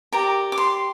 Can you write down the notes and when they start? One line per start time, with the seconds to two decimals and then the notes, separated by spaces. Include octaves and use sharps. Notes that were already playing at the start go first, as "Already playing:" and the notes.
0.12 G4 A#4 D5 A#5
0.52 D6
0.58 C6